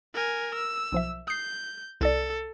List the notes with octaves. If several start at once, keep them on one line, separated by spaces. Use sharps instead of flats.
A#4 G#5
E6
B1 F3 E5
D#6 G6 C7
C2 A4 D5